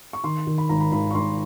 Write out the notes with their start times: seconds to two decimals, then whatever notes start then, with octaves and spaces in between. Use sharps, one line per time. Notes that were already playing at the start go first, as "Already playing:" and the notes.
0.13 C#6
0.24 D#3 C6
0.47 D#3
0.58 B5
0.69 G#1 A#5
0.81 B5
0.92 G#1 B5
1.11 C#6
1.15 G#1 C6